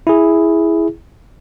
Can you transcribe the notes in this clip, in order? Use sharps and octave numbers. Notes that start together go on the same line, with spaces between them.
E4 G#4